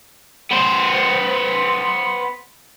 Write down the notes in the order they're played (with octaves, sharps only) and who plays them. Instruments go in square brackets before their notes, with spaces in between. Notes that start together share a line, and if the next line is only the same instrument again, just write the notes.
[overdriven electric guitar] B3 C5